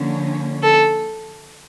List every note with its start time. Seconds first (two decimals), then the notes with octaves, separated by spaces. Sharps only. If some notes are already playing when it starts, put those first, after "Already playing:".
Already playing: D3 F3 A#3 C#4
0.62 A4